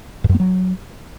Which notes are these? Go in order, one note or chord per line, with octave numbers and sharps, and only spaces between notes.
G2
F#2
A#3
F#3